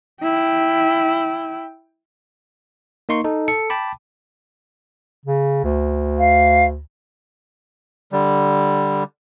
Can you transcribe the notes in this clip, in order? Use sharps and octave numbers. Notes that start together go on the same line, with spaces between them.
E4 G5
A#3 D#4 C6 C#6
D#4 A4
A4 C#7
G5 A5 B5 D6
C#3
D2
F5
D3 G3